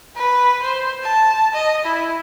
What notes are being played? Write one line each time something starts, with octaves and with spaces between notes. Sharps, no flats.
B4
C5
A5
D#5
E4